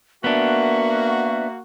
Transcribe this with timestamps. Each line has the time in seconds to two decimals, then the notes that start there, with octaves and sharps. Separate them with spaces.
0.24 A#3 B3 D4 F#4 E5